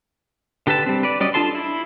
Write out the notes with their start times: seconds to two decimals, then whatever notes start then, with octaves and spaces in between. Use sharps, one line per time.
0.67 D3 G4 A4 B4 A5
0.86 G3 C4
1.03 B4 D5
1.20 F#3 G3 C#4 D5 D#5
1.34 D4 F4 A4 A5 C6
1.55 E4